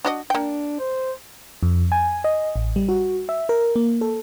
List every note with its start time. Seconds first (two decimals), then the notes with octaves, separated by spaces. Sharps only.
0.05 D4 F#4 D#5
0.30 A#3 D4 G5
0.79 C5
1.63 F2
1.92 G#5
2.24 D#5
2.56 A1
2.76 G3
2.89 F#4
3.29 E5
3.49 A#4
3.76 A#3
4.01 A4